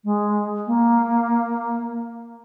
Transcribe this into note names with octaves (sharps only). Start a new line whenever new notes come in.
G#3
A#3